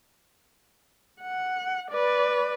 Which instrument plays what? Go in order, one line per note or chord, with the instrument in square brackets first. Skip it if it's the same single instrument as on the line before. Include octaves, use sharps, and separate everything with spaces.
[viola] F#5
B4 D5